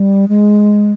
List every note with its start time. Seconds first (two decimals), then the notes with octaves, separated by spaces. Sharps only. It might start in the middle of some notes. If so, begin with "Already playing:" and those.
Already playing: G3
0.29 G#3